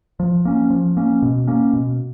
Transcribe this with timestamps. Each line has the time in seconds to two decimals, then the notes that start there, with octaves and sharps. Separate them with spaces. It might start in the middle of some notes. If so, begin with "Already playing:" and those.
0.20 F3
0.45 A#3 C#4
0.70 F3
0.97 A#3 C#4
1.22 B2
1.47 A#3 C#4
1.73 B2